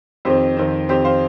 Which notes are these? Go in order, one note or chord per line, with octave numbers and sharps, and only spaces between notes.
F2 D#3 C4 G4 C5
F2 D#3 C4
F2 D#3 C4 G4 C5
C5 F5